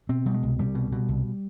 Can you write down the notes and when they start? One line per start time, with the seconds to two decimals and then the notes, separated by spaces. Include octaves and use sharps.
0.09 B2 C4
0.26 B2 G3
0.34 G#3
0.43 C2
0.59 C2 G3
0.75 B2
0.92 B2
1.09 C2